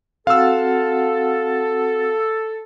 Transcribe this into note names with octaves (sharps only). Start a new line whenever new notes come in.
C4 F#4 A4 F5 F#5 E6